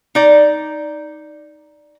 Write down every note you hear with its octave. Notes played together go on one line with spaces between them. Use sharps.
D#4 D5